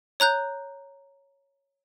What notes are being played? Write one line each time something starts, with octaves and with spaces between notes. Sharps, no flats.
C#5 A#5 F#6 G6